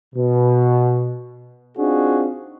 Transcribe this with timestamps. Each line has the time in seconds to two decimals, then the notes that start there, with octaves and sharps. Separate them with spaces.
0.15 B2
1.78 C4 D4 D#4 F4 F#4 G#4